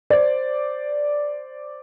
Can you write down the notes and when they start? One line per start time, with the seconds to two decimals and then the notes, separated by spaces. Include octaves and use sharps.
0.10 C5 D5